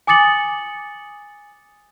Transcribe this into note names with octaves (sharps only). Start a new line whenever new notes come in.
G#5 D6 D#6 A6 C#7 F#7